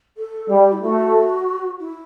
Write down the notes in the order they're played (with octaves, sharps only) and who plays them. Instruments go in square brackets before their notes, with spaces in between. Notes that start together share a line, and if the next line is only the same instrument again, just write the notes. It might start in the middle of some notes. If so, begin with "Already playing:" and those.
[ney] A4
[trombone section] G3 [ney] G4
[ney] E4
[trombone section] A3 [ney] F#4
[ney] E4